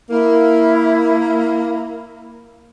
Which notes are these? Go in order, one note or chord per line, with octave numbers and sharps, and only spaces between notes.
A#3 E4